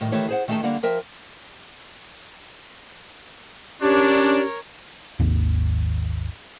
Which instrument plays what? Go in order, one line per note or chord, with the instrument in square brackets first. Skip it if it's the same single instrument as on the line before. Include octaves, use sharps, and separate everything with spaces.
[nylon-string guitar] A2 D#3 G3
D#3 E3 A3 G4 C#5
G#4 C5 F#5
D#3 A3 D#4 G#4 G5 A5
D3 G3 A#3 D5 F#5
F3 A#4 E5 G5
[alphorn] C#4 [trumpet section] D4 [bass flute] G4 [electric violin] A#4 C#5
[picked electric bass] G#1 D#2